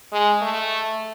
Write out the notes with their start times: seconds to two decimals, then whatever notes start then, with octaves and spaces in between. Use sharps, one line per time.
0.12 G#3
0.41 A3